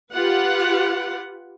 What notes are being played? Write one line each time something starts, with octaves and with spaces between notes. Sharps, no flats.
F4 G4 B4 F#5